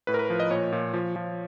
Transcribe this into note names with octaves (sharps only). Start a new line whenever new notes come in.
A2 B4
A#4
B4
F3
D#5
A#2 C#5
A#2
F3
F3